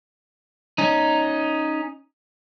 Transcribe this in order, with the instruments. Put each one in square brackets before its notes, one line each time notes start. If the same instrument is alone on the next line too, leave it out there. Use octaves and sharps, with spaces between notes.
[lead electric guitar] C#4 D#4